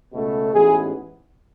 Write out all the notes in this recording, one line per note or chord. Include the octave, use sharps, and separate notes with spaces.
C#2 B2 A3
A1 G#2 E3 B3 G#4